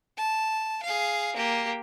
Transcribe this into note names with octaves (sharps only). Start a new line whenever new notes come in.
A5
G#4 F5
A#3 G4